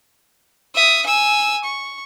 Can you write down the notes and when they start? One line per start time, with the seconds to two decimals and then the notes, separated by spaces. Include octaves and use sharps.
0.75 E5 D#6
1.06 G#5 E6
1.65 C#6